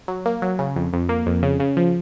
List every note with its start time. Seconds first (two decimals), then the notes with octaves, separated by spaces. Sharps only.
0.08 F#3
0.26 A#3
0.42 F#3
0.59 C#3
0.76 F2
0.93 F2
1.09 A#3
1.26 F2
1.43 C#3
1.60 C#3
1.77 F3